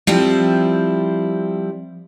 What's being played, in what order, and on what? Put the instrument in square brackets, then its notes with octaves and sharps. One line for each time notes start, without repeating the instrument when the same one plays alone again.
[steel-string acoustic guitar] F3 G3 C4 E4